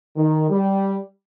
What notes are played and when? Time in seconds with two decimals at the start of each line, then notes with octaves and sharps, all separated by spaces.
0.16 D#3
0.50 G3